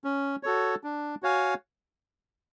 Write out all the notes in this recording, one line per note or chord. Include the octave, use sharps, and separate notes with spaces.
C#4
F#4 A4 C#5
D4
F#4 C#5 F5 G#5